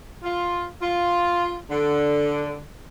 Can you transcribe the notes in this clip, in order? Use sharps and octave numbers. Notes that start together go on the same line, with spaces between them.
F4
F4
D3